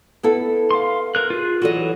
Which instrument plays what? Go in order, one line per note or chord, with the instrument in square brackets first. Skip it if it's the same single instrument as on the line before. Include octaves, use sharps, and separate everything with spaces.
[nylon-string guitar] B3 E4 A4
[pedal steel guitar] F5 C6
A#4 F#6
F4 G#4
[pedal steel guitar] E3 F#3 [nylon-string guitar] F#4 A4 D#5